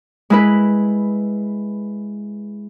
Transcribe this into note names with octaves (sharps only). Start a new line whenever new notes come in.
G#3 E4 B4